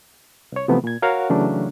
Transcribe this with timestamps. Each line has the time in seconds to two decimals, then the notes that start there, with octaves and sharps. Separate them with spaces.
0.52 C2 C#5
0.68 C3 E3 F3 A3 B3
0.84 A#2 G#6
1.02 F#4 A#4 C#5 F5 F#5
1.30 C#3 E3 F#3 A3 C#4 D4